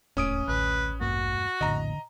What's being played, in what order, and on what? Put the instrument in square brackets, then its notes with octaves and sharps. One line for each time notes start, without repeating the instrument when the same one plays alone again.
[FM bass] D1 [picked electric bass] G#1 D#2 A3 [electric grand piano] C#4 D#6 D7
[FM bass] A1 [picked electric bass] D2 [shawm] B4
[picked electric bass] E1 G2 A#3 [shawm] F#4
[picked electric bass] A#1 F2 A2 [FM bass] D3 [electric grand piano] D#5 A#5